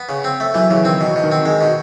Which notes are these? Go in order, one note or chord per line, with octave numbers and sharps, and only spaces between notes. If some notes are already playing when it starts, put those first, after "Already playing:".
Already playing: B3
C#3
C4
A3
E3 F#3
C#3 E3
D#3 C4
B2
B2
D#3
C4
D#3 G#3
B2